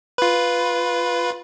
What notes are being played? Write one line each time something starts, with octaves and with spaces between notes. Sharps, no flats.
F4 B4